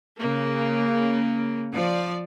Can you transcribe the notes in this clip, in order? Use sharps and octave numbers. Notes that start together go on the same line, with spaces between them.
C#3 A#3
F3 D5